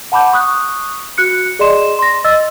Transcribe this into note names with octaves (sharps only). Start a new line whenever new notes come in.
F#5 A5 B5 D6 G6
C#6 D#6 F#6
F#4 F#6 C#7
G#4 D5 D#5 C6 E7
C6 A#6
D#5 E6 A6